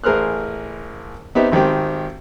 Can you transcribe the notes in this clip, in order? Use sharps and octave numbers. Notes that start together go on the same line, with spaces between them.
A1 G#4 A#4 C5 F6 F#6
B3 C4 D#4 G4 E5
G#1 D#3 C4 G4